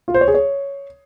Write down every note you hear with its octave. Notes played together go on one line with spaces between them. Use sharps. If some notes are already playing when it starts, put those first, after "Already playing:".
F4
C5
C#5
G#4
C#5